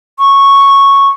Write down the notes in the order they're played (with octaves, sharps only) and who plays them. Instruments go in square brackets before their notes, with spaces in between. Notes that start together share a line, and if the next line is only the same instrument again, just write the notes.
[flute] C#6